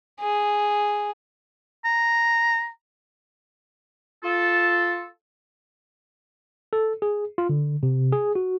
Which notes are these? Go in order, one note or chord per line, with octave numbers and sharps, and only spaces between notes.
G#4
A#5
F4 A4
A4
G#4
F4
D3
C3
G#4
F#4